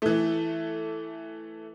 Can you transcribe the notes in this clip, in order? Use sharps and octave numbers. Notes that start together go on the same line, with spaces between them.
E3 A3